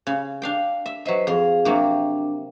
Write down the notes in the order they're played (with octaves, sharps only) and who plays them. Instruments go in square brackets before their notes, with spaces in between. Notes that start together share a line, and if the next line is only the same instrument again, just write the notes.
[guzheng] C#3
D4 F5 G5
E5
[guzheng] F#3 E5 [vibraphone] B4 C5 D#5
[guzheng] F2 C6 [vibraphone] G#4 F5
[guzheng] C3 F#3 A#3 [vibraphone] D4